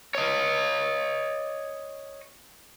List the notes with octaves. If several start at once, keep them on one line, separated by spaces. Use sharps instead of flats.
C#5 D#5